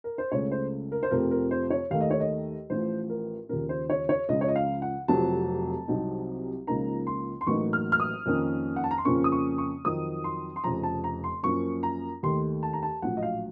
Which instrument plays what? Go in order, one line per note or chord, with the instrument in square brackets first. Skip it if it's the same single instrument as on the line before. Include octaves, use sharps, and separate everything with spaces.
[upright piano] A#4
C5
C#2 C#3 A3 C#5
C5
A#4
C5
F2 C3 F3 A3 C4 A#4
A#4
C5
C#5
D#2 D#3 A3 F5
D#5
C#5
D#5
A1 A2 F3 C5
A#4
D#2 C#3 F3 A#4
C5
C#5
C#5
C#2 C#3 F3 D#5
C#5
D#5
F5
F#5
F1 F2 C3 F#3 A5
C2 C3 F#3 C4 D#4
C#2 C#3 F3 A#3 D#4 A#5
C6
C6
A1 A2 F#3 A#3 D#4 C#6
F6
F6
D#6
F2 D#3 A#3 C#4
F#5
A5
A#5
C6
F2 C#3 F3 A#3 C#4 C#6
D#6
C#6
C#6
F2 D#3 F#3 D#6
C6
C6
F1 F2 C#3 A#5
A5
A#5
C6
F#2 F3 A#3 C#4 C#6
A#5
D#2 D#3 A3 C6
A5
A#5
A5
A#1 A2 F#3 F#5
D#5
F5